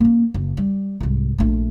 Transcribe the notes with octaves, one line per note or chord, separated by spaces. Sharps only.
A#3 C#4
F#1
G3
C2 G#2
A#1 A3